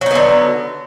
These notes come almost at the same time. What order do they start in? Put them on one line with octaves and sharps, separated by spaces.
F#3 D#4 B3 D3